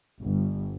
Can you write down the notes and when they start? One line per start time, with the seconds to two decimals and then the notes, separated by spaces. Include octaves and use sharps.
0.22 G1